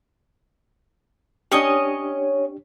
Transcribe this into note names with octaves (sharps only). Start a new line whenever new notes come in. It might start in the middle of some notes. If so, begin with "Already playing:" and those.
C#4 D4 G4 C#5 D#5